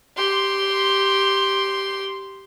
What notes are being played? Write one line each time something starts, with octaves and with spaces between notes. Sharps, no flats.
G4 C6